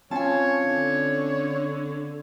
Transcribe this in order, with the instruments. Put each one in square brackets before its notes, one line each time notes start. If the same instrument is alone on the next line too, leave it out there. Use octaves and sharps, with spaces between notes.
[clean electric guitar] C4 C#4 F4 [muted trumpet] C#5 [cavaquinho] G#5 A5
[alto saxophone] D3